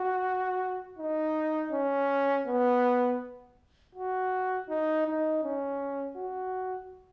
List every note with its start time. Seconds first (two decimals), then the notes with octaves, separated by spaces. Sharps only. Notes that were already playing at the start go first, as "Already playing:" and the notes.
Already playing: F#4
0.99 D#4
1.72 C#4
2.47 B3
3.95 F#4
4.69 D#4
5.06 D#4
5.43 C#4
6.17 F#4